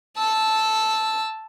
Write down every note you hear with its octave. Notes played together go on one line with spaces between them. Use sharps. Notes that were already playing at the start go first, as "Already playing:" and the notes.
A5 E6